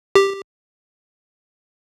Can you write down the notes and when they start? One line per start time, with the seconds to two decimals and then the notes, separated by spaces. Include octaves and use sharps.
0.15 G4